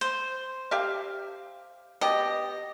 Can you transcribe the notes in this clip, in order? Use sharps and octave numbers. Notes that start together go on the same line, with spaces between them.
C5
G4 E5 F5
B2 G4 D#5